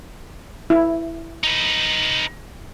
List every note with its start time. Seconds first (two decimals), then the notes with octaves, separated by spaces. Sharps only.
0.70 E4
1.44 D#4 B4